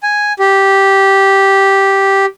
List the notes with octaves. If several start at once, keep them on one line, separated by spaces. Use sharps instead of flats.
G#5
G4